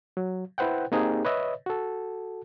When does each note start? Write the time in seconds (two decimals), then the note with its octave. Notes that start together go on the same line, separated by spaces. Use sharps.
0.17 F#3
0.58 E4 B4 C5 F#5 G5
0.92 A#3 C4 D#4 G4 G#4
1.25 B4 C#5 D#5 E5
1.66 F#4 A4